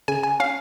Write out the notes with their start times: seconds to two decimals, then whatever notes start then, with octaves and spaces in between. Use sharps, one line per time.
0.08 C#3 G#5
0.23 G#5
0.40 C#4 F5